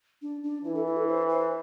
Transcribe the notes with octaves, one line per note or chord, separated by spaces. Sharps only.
D4
D4
E3 E4
A4
E4
A4
C5
C5